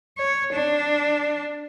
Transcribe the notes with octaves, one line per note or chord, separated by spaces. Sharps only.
C#5
D4